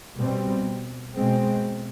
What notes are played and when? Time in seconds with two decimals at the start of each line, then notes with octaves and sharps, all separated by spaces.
0.20 B2 G3 C4
1.15 B2 G#3 C4